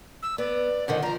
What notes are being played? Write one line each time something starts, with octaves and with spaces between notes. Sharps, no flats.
E6
B3 D5
F2 D3 D#3 F#5
F3 A#4 A#5